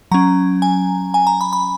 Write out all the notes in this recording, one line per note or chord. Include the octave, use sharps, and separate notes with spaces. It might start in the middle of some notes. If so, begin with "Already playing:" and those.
F#3 C#4 A#5
G#5
G#5
A#5
B5
B5